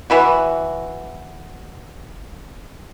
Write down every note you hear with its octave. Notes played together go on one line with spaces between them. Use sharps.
E3 E4 F#4